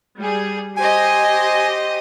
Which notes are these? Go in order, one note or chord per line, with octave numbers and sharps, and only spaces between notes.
G3 G#4
G4 C5 D#5 G#5